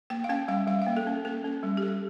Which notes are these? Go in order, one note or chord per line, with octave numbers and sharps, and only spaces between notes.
A#3 G5
F5
C#4 G5
G3 F5
G3 F5
F5
A#3
A4
C#4
A#3 A4
C#4
G3
G4
G3 A4